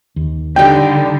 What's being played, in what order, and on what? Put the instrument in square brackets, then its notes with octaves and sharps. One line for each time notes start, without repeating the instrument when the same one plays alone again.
[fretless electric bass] D#2
[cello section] D3 [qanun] G3 D#4 [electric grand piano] G5